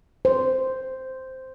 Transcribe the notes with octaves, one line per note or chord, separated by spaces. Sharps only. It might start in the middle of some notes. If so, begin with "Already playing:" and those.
C5